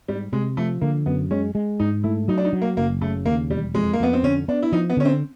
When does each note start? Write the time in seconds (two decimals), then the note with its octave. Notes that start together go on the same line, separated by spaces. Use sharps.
0.08 G#2 G3
0.32 C3 G#3
0.57 F3 A3
0.81 D3 A#3
1.06 F#2 B3
1.31 G#3 C#4
1.55 G#3
1.80 G#2 D#4
2.03 A3 E4
2.28 F#3 D#4
2.38 D4
2.44 D#4
2.53 F#3
2.62 A#3
2.77 F#1 A#3
3.01 C#3 A3
3.26 D#2 A#3
3.50 E1 G3
3.75 F2 G#3
3.93 A#3
4.00 F2 B3
4.13 C4
4.23 D3 C#4
4.48 B3 D4
4.62 E4
4.72 F3 D#4
4.90 B3
4.97 D3 C#4
5.05 C4